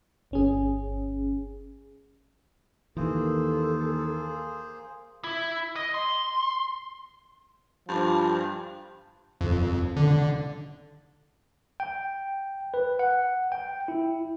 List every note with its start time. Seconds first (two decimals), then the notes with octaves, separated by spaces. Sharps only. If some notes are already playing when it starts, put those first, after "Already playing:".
0.31 G1 C#4 G#4
2.97 D#2 E3 A#3 G#4 A4 C5
5.24 E4
5.76 D#5
5.94 C6
7.88 G2 F3
9.41 F2
9.96 D3
11.80 G5
12.74 B4
12.99 F#5
13.52 G5
13.88 E4